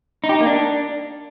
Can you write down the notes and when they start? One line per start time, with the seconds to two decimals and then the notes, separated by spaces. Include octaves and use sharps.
0.24 D#4
0.29 G4
0.35 D#4
0.41 A#3
0.46 D4